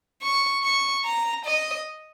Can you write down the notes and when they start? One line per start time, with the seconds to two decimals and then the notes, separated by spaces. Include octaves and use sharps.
0.22 C#6
0.63 C#6
1.05 A#5
1.45 D#5